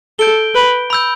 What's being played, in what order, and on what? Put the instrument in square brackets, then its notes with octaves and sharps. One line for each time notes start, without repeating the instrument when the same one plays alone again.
[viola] A4 [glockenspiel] G6 D7 G7
[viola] B4
[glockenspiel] B5 E6 G6